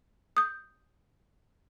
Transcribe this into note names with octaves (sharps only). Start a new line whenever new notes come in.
D#6 G6